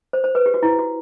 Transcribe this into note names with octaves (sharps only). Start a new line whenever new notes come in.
C5
C5
B4
G4
F#4
E4
F#4